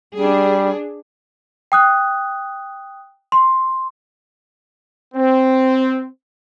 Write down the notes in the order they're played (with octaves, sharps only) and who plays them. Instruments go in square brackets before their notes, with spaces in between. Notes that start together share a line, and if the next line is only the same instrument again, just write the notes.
[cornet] G3 [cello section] D4 G#4
[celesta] G5 D#6 F#6
C6
[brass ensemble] C4